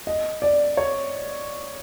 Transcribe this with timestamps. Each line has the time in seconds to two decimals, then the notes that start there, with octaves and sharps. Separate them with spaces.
0.07 D#5
0.42 D5
0.77 C#5